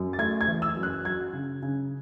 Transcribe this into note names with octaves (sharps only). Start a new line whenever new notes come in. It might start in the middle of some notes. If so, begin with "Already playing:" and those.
Already playing: F#2
A6
A3 G#6
G#6
E3
E6
F#2
F#6
F#3 G#6
C#3
C#3